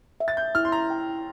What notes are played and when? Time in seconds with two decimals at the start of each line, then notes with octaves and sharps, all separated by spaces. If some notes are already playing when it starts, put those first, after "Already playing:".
0.20 E5
0.28 A6
0.37 G6
0.55 E4 F6
0.65 C6
0.72 A#5
0.90 G5